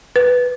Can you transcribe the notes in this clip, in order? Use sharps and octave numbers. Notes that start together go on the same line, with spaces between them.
B4